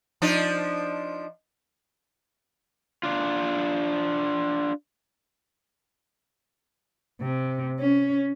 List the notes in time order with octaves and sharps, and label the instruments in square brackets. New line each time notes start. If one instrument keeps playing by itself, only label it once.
[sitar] F3 D4 D#4
[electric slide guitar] D4 F4
[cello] C3
C#4